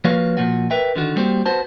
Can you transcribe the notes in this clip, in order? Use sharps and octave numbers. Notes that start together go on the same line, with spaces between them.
F3 A#3 F#4 B4 C#5 F5
A#2 F3 F#4
A#4 B4 E5 G5
D3 D#3 F#4
G3 A#3 C4 F#4 G4
B3 F#4 C5 A5